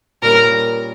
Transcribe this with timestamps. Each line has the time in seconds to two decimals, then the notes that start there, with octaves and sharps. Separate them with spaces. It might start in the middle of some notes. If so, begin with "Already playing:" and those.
0.22 A#2 G3 A#3 C#4 A#4